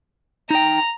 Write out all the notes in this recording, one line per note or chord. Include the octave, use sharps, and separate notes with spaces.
D#4 G5 A#5